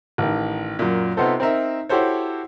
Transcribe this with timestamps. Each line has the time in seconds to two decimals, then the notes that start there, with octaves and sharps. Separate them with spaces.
0.18 A1 D#3
0.79 F#2 A#2
1.17 C3 B3 D#4 F4 A4 C5
1.40 C4 D#4 A#4 E5
1.89 E4 F#4 G4 A4 C5 C#5